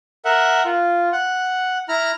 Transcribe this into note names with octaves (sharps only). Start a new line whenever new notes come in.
A#4 E5 F#5
F4
F#5
E4 A#5 F6